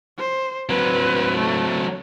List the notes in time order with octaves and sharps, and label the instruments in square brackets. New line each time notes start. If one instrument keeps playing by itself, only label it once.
[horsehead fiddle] C5
[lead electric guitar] F#3 C4 [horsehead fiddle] B4
[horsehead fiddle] A3